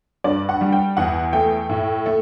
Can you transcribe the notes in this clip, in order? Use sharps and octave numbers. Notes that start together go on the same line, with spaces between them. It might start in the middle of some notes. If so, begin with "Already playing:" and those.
G2 D5
F#5
G3
G5
E2 F#5
A3 G5
A2
A3